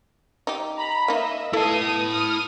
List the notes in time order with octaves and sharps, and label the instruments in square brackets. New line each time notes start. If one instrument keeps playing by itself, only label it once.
[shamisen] D#4 G4
[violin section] A#5 B5
[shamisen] A#3 D#4 [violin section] D#5 E5
[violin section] B3 D#6 [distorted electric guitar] E4 A5 [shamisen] A4 E5 F5
[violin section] D#6 F6